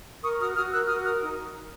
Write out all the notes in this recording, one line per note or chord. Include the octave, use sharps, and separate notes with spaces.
A#4 C#6 D#6
F#4 D#6 F6
F#4 D#6 F6
A#4 E6 F#6
F#4 D#6 F6
A#4 D#6 F6
D#4